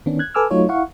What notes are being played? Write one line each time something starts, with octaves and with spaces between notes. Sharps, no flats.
D#3 B3 C#4 D4
F#6 G#6
A4 B4 G#5 D6 E6 F6
F#3 A3 D#4 F4 C#5
E4 F5 F#5 C#6